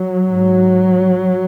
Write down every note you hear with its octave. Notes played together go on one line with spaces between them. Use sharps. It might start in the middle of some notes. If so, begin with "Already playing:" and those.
Already playing: F#3
G#2